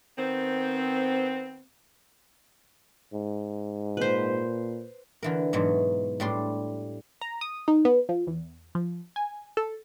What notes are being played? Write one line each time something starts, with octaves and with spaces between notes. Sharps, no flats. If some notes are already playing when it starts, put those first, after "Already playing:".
D#3 B3 C4
G#2
A#2 B4 C5
D3 E3 A#4
G#2 B2 E3 F#3
A2 G3 D4 C6
A#5
D#6
D#4
B3
F3
E2
F3
G#5
A4